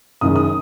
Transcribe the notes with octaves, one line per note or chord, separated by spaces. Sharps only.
F#1 F#2 D#3 G#3 D#6
D#6